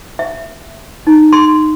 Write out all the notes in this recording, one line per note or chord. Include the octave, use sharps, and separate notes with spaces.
E5
D#4
C6